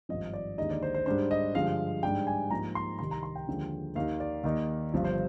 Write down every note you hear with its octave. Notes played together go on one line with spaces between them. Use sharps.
G#1 G2 F3 D#5
D5
D#2 D3 G#3 D#4 D#5
D5
C5
C5
G#2 G3 D4 C5
D#5
G2 D3 F3 G#3 F5
G#2 G3 D4 G5
G#5
G#2 F3 A#3 D#4 A#5
C6
C2 C3 D#3 C6
A#5
C6
G5
D#2 D3 F3 G#3
D#2 D#3 A#3 D#4 F5
D5
D#2 D#3 A#3 D#4
G1 G2 F3
C5